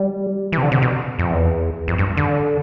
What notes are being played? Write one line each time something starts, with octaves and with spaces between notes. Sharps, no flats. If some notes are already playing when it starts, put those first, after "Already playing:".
Already playing: G3
E3
C3
D3
C3
B2
F2
E2
F2
G2
D3